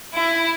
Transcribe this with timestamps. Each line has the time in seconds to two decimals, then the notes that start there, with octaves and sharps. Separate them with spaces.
0.14 E4